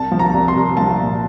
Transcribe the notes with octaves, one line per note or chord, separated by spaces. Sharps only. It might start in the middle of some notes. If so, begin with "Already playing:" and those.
Already playing: C2 A5
F3
A#5
C2
C6
C2
F3 A5
A#2